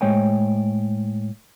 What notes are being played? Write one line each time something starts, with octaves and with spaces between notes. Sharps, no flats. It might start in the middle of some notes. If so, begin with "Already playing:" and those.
A2 G#3 C5 C#5 G5 G#5